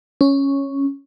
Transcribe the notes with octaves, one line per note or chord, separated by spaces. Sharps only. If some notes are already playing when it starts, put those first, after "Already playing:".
C#4